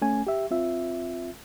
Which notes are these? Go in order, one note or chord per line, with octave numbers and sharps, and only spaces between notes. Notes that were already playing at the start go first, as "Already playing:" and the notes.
A3 C#4 G#5
G4 E5
C4 F4 E5